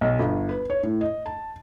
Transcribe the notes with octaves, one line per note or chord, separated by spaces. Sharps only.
B1
G1
B4
C#5
A2
D#5
A5